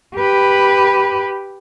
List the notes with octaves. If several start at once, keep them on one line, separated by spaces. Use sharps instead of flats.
G4 B4